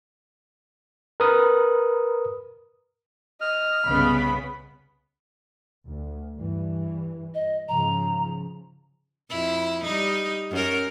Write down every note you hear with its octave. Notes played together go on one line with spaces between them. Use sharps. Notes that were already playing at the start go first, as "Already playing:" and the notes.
A#4 B4 D#6
D#5 F6
C2 G2 C#3 B3 B5
D2
G2 E3
D#5
G#2 C#3 F3 A#5
F2 E4
G3 D#4
F#2 A#4